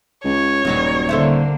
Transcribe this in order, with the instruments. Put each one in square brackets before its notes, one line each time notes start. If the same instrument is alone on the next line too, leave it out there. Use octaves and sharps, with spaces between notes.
[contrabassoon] C#2 [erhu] C#5
[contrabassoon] D#1 [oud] G2 F#3 G#3
[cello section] D3 A#3 [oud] A4 C5 E5